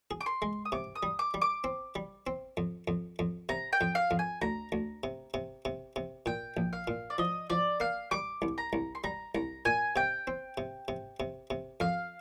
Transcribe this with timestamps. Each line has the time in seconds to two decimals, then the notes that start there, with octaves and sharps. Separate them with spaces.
0.11 G#4
0.21 D6
0.26 C6
0.42 G#3
0.65 D#6
0.72 C3 D6
0.95 D#6
1.03 G3
1.19 D6
1.34 G3
1.42 D6
1.64 C4
1.95 G3
2.27 C4
2.57 F2
2.88 F2
3.19 F2
3.49 C3 A#5
3.73 G5
3.81 F2
3.95 F5
4.11 F2
4.19 G#5
4.41 D2 A#5
4.72 D2
5.04 C3
5.34 C3
5.65 C3
5.96 C3
6.26 A#2 G5
6.57 A#1
6.73 F5
6.88 A#2
7.10 D5
7.18 F3 D#5
7.50 F3 D5
7.80 A#3 F5
8.11 G3 D6
8.42 C2
8.58 A#5
8.73 C2
8.95 C6
9.04 G3 A#5
9.35 C2 A#5
9.65 A#2 G#5
9.96 C3 G5
10.27 C4
10.58 C3
10.88 C3
11.20 C3
11.50 C3
11.80 F2 F5